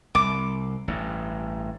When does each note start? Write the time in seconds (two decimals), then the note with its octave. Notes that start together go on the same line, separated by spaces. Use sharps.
0.15 C2 D6
0.88 A1 G2